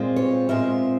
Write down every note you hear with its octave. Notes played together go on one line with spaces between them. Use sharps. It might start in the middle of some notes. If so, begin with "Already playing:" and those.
Already playing: A#2 G#3 C4 F4
C#5
A#2 G#3 C4 F4 E5